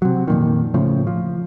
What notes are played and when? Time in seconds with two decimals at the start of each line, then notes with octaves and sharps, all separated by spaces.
0.02 C3 F#3
0.28 F2 A#2 D#3
0.74 A2 C#3 F3
1.07 F3